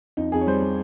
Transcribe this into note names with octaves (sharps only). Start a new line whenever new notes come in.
F2 D#4
F2 G#4
C#5
G3 C5
G3